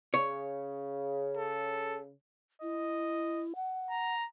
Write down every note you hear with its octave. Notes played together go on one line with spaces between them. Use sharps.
C#3 C#5
A4
E4 D#5
F#5
A#5